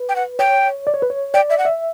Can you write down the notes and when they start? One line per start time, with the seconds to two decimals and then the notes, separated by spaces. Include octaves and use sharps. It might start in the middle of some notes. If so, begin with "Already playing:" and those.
Already playing: B4
0.09 G5
0.16 F#5
0.39 C#5 G5
0.87 D5
0.94 C#5
1.02 B4
1.10 C#5
1.34 D5 G5
1.50 E5
1.58 F#5
1.65 E5